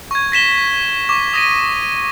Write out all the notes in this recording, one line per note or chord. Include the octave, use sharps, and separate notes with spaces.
C#6 G#6
A#6 B6 E7 G7
C#6 D6
D#6 A#6 D#7